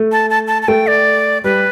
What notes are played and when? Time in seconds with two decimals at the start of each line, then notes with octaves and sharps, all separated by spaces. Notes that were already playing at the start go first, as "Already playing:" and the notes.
Already playing: A3
0.12 A5
0.30 A5
0.47 A5
0.62 A5
0.68 A3 G5
0.87 D5
1.44 G3 B4